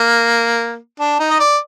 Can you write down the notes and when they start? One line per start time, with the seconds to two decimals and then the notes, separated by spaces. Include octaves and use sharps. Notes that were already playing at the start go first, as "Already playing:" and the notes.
Already playing: A#3
1.00 D4
1.20 D#4
1.30 D#5
1.40 D5